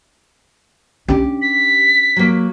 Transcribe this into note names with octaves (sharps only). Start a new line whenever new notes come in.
C#4 D4 G4
B6
F#3 A#3